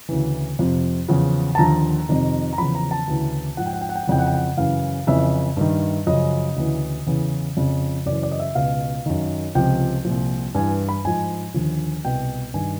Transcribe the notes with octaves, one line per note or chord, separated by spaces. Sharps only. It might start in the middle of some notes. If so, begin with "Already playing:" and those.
D2 C#3 E3
F2 C3 F3
E2 C#3 F3
A5
D#2 D3 F3 A#5
F2 C3 D#3
A#5
E2 C#3 F3 B5
A#5
A5
D2 C#3 E3
G#2 F3 F#5
G5
F#5
G5
F#5
G5
F#5
F2 C#3 E3 G5
F#5
G5
F#5
F#2 C#3 E3 F5
F2 C#3 E3 E5
G2 D#3
F#2 C#3 F3 D#5
D2 C#3 E3
E2 C#3 E3
F2 C#3 F3
F#2 C#3 E3 D5
D5
D#5
E5
C#2 B2 F5
F#2 D#3
C#2 C3 F3 G5
C2 A#2 F3
G2 E3 G#5
B5
G#2 F3 G#5
D#2 D3 F3
C2 B2 G5
G2 D#3 G#5